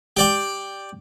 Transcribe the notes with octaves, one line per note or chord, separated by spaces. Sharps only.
G4 D5 G5